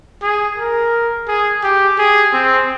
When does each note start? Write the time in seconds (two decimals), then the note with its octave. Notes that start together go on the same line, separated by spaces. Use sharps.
0.23 G#4
0.58 A#4
1.28 G#4
1.63 G4
1.98 G#4
2.33 C4